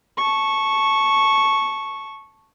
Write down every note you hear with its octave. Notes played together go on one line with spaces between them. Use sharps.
A5 C#6